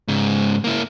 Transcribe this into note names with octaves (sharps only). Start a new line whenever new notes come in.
G#2 C#3
A#3 E4